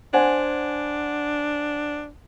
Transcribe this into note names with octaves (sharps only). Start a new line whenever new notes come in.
D4 C5 F#5 G#5